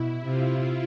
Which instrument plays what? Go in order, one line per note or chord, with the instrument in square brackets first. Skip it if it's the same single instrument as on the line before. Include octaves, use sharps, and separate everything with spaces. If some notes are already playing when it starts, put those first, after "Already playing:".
Already playing: [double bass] B2 [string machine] E4
[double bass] C3 [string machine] F4